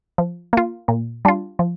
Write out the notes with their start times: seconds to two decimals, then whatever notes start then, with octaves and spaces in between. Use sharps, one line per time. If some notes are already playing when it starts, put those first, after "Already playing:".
0.18 F3
0.53 A#3 F4
0.88 A#2
1.25 G3 D4 F4
1.59 F3